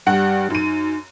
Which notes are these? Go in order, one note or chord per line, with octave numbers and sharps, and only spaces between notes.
G2 G3 G4 F#5
F#2 D#4 D#7